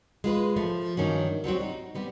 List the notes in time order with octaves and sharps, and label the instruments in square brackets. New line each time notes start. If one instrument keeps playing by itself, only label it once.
[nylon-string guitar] G#3 F4 B4
F3 A3
G2 D#3 C#4 F#4
F#3 G3 C4 F#4
D#4
G3 B3 C4